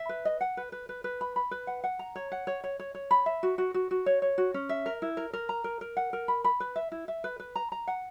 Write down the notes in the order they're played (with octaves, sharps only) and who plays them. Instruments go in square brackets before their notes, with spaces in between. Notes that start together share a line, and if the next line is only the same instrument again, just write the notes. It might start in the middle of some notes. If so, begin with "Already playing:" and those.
Already playing: [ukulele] E5
B4
D#5
F#5
B4
B4
B4
B4
B5
B5
B4
F#5
F#5
A#5
C#5
F#5
C#5
C#5
C#5
C#5
B5
E5
F#4
F#4
F#4
F#4
C#5
C#5
F#4
C#4
E5
A#4
E4
A#4
A#4
A#5
A#4
A#4
F#5
A#4
B5
B5
B4
E5
E4
E5
B4
B4
A#5
A#5
F#5